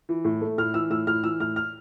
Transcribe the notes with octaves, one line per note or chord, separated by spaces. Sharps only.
E3
A2
A3
A2 F6
E3 E6
A2 E6
A2 F6
E3 E6
A2 F6
F6